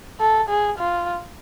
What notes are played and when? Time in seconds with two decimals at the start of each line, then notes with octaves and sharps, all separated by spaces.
0.20 A4
0.49 G#4
0.79 F4